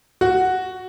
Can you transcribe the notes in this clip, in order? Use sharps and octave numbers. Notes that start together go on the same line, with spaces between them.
F#4